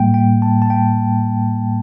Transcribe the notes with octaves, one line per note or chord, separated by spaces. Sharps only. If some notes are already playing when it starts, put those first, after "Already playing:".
Already playing: A2 G3 A#3 G5
G5
A5
A5
G5